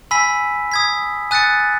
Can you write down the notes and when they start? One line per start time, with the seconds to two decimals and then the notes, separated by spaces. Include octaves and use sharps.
0.11 G#5 B5 E6 B6
0.72 D#6 G#6 B6
1.31 G#5 D#6 F#6 A6 C#7